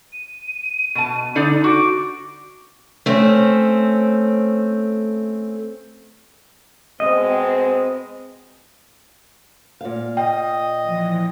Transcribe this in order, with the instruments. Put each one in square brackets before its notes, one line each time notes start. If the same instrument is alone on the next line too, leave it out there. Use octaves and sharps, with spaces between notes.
[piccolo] D#7
[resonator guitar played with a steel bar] B2 A5
D3 D#4 D5
[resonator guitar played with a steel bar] F#4 [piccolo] D6
[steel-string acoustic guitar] A3 C4 C#4
[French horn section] B2 G#3 C4 [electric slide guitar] D#5
[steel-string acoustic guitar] A#2 F5
[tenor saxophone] D#5 [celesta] G5
[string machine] E3 F3 A#6